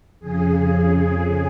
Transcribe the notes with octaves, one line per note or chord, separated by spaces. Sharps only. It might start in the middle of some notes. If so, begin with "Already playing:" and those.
F2 C#3 G#4